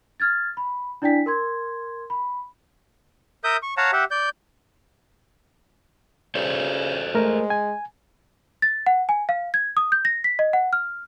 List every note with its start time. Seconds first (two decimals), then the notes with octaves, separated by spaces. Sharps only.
0.20 F6 G#6 A6
0.57 B5
1.02 D4 E4 D5 G5 G#5 B6
1.26 A#4 C6 G#6
2.10 B5
3.44 A#4 E5 D#6 G6
3.63 C#6
3.77 C#5 F5 F#5 A5 A#5
3.93 G4 E5 F#5
4.11 D5 G6
6.35 C#3 A4 C5 D5
7.15 G#3 A3 A#4
7.50 G#5
8.62 A6
8.86 F#5
9.09 G#5
9.29 F5
9.54 G#6
9.77 D#6
9.92 G6
10.05 A#6
10.24 B6
10.39 D#5
10.53 F#5
10.73 F6